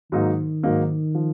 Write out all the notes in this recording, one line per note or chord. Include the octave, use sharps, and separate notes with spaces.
G#2 D#3 F#3 A#3 D#4
G#2 F#3 A#3 D#4
F3